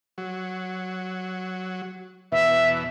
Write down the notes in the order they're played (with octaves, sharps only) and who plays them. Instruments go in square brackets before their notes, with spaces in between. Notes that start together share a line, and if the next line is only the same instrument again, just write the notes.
[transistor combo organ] F#3
[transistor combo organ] E2 B2 [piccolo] E5